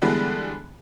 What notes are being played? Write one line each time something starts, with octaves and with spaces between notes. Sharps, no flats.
D3 E3 G3 G#3 B3 D4